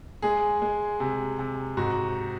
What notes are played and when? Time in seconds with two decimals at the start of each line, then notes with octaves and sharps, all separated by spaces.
0.22 G#3 G#4
0.62 G#3
1.00 C3
1.39 C3
1.77 G#2 F#4